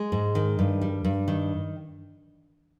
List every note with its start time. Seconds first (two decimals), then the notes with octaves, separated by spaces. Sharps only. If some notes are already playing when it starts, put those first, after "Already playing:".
Already playing: G#3
0.12 G#2
0.35 D#3
0.59 G2
0.81 G3
1.05 G2
1.28 D#3